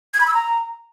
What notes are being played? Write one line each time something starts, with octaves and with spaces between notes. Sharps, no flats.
G#6
B5
E6
A#5